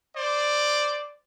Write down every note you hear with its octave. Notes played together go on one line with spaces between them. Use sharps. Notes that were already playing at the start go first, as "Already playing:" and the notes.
C5 D5